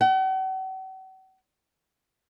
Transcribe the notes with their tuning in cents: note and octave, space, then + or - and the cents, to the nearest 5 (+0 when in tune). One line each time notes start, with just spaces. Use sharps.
F#5 +45